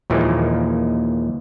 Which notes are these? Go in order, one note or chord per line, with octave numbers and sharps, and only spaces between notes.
D#2 A#2 E3 F3 G#3